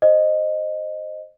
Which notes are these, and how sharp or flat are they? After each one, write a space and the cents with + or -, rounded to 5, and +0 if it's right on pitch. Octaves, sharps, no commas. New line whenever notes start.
C5 +0 D#5 -10